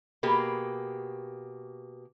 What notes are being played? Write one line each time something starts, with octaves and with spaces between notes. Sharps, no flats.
B2 A#3 G4 G#4